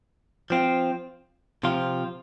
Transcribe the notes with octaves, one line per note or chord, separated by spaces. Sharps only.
F3 C4 F4
C3 F3 C4 F4